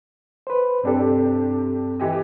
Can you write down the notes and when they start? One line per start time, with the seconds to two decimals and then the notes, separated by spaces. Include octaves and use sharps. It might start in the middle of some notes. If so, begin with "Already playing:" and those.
0.47 B4 C5
0.84 G2 C3 D4 G4 A4
2.00 E3 G4 D#5